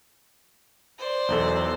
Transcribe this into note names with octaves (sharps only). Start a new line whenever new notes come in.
C5 D5
B1 E2 A4